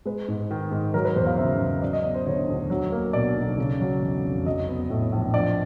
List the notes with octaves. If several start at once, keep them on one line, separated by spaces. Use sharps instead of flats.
G#3 B4
G#2
D#3
G#2
F#3 A#4
B4
E2 C5
F5
C#3 E5
E2
F#3 D5
D#5
B3 D5
C5
D3 C#5
D2
F#3
A#3
B2 D5
B1
C#3
F#3
E2
F1
F#3 D#5
B3
A2
A#1
F3 D5